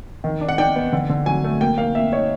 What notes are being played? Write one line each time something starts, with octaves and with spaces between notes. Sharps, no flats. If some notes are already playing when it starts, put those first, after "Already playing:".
D#3
D4
F#5
D4 G5
B3
D3
D3
F#3 G#5
A3
A#3 G5
A#3 F5
A#3 E5
D#4 C#5